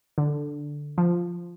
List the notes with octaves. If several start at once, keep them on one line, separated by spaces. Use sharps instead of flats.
D3
F3